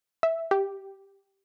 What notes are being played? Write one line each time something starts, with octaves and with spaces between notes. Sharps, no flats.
E5
G4